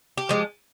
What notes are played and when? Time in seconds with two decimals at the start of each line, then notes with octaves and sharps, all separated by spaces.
0.17 G4
0.29 F3 G#3